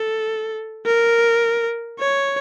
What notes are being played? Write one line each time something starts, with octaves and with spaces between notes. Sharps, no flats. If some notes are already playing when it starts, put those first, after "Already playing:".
Already playing: A4
A#4
C#5